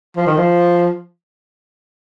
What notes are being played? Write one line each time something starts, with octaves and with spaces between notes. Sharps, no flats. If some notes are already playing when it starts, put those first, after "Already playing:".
F3
D#3
F3